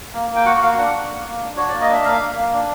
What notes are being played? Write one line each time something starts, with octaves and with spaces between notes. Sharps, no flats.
A#3
A#3
G5
F#4 F#5
A#3 F5
D4 F#5
F#4
A#3
A#3
D4
F#4 C#5
A#3 D5
D#5
D4 E5
A#3 F5
A#3
A#3
D4